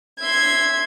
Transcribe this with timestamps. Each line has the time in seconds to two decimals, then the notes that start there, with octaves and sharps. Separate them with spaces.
0.21 E5 C6 G#6